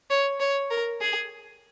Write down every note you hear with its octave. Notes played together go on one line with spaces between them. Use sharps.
C#5
C#5
A#4
G#4